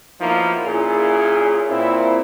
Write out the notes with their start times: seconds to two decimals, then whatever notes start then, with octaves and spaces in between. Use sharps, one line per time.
0.21 F3 F#3 A#3 B3 D#4 E4
0.66 A#2 C#4 E4 G#4
1.70 A#2 C4 E4